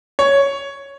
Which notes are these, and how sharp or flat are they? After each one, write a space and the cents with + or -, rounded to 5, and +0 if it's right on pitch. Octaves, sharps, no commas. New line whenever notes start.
C#5 +5